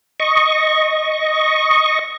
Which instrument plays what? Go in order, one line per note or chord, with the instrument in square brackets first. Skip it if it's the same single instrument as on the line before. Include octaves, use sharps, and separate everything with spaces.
[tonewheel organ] D#5 C#6